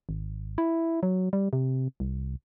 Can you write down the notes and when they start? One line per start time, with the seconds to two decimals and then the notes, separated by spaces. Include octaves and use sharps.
0.09 G#1
0.58 E4
1.03 F#3
1.33 G3
1.53 C3
2.00 C2